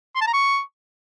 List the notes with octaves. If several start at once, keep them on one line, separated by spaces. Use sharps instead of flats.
C6
A5
A#5
C#6